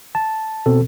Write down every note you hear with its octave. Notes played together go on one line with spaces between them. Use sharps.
A5
B2 C4 A4